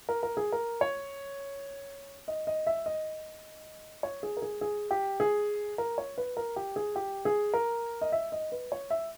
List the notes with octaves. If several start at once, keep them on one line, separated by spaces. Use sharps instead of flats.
A#4
A#4
G#4
A#4
C#5
D#5
D#5
E5
D#5
C#5
G#4
A#4
G#4
G#4
G4
G#4
A#4
C#5
B4
A#4
G4
G#4
G4
G#4
A#4
D#5
E5
D#5
B4
C#5
E5